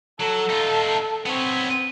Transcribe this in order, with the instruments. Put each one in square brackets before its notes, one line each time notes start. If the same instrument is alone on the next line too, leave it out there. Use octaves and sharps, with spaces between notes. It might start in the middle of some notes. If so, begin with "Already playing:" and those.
[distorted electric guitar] F#3 [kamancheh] A4
[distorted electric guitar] D#4 F4
[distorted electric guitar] B3 C#5 [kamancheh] C4